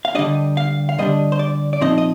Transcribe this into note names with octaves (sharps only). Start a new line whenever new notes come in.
F5
D3 G3 D4 D#5
F5
F5
D3 G3 D4 D#5
C5
D5
D5
A#2 F3 C4 D#4 D#5
D#5